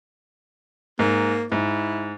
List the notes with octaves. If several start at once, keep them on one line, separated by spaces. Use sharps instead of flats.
G#2 A#3
G#2 E4